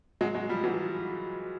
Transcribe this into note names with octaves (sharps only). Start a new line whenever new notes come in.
F#3 G#3
F#3 G#3
F3 G3
E3 F#3